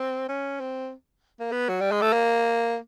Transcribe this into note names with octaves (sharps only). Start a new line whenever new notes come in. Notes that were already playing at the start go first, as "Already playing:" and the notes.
Already playing: C4
C#4
C4
A#3
B3
F#3
G3
G#3
A3
A#3